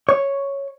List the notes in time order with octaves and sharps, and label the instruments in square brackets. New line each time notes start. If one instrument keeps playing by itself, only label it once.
[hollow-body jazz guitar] C#5